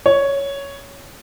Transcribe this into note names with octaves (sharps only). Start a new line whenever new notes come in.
C#5